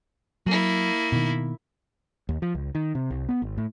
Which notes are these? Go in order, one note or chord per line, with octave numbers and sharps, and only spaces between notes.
F#3 A#3 E4
B2 D#3
D#2
F3
C#2
D#3
C3
C2
B3
G#1
A2